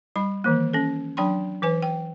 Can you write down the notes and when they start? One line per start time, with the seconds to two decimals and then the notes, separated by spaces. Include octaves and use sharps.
0.16 G3 B5
0.44 D#3 E3 A#3
0.73 C#4 A4
1.17 F#3 D4 G5 B5 C6
1.62 E3 B4 G#5
1.82 G5